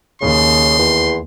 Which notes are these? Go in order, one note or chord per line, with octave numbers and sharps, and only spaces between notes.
D#2 C#3 C6
E2